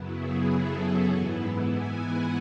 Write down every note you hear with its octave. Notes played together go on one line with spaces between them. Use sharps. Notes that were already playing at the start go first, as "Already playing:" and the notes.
Already playing: F#2 C#3 F#3 B3 E4
G#4
A4
G#2 E3 B3 E4
G#5
F#5